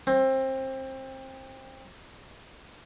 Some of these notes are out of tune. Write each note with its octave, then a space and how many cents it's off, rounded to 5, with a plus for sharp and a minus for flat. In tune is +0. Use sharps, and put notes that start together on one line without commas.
C4 +25